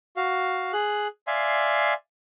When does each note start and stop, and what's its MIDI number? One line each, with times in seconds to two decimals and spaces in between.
0.17 0.72 66
0.17 0.72 77
0.73 1.07 68
0.73 1.07 90
1.27 1.94 74
1.27 1.94 76
1.27 1.94 77
1.27 1.94 80
1.27 1.94 84